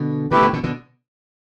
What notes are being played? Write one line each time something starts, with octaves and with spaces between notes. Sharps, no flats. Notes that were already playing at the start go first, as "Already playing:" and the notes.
Already playing: B2 D3
B2 D3 A3 E4 G4 B4
B2 D3
B2 D3
B2 D3